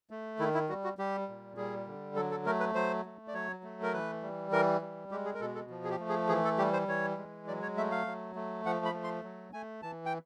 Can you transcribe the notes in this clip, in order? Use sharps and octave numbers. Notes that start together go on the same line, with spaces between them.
A3
D#3 E4
E4
G3 F#4
F#4
G3 G4
A#2
G3 G#4
D3
F#3 A4
A4
A3 A#4
B4
F#3 C5
A3
D5
F#3 C#5
A3
A#4
E3 B4
G3
E3 A#4
G3
G#3 G4
G#4
A#4
B2 A4
A4
F3
G#4
G4
A3
G#4
E3 G#4
A4
G3 G4
C5
E3 C#5
G#3
F#3 D5
C#5
A3 E5
F5
F#3
A3
F3 F#5
B5
A3
C6
F#3
A3 G#5
E3 A5
G5